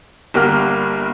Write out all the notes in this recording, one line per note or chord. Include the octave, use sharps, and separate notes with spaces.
G1 G3 A#3 A#4 F#5 F6